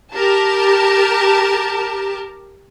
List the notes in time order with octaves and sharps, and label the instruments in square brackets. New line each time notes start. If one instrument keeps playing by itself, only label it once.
[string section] G4 A#4 A5